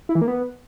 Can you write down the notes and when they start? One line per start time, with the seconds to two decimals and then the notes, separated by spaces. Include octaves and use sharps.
0.09 E4
0.15 E3
0.21 A#3
0.28 B3